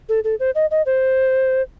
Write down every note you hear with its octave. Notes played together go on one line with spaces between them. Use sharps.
A4
A4
C5
D#5
D#5
C5